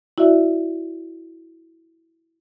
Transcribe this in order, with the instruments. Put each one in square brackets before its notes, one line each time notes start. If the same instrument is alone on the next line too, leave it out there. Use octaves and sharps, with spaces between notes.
[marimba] E4 F#4 D5 E5